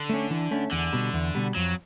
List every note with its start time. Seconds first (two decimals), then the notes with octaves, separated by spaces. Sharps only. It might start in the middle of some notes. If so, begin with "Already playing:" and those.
Already playing: D3
0.09 A3 C#4
0.31 E3
0.51 A3 C#4
0.72 E2 D3
0.93 B2 G3
1.13 E2
1.35 B2 G3
1.55 F2 F#3